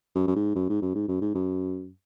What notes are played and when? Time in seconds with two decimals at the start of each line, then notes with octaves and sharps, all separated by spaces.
0.15 F#2
0.27 F#2
0.36 G#2
0.55 F#2
0.69 G#2
0.82 F#2
0.95 G#2
1.08 F#2
1.21 G#2
1.34 F#2